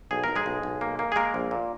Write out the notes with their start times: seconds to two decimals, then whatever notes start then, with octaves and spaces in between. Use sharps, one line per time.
0.11 B1 G#4
0.24 B1 A#4
0.36 G#3 G#4
0.46 B1
0.63 B1
0.81 A#3
0.99 A#3
1.12 G#4
1.16 G#3 A#3 A#4
1.34 A#1
1.51 A#2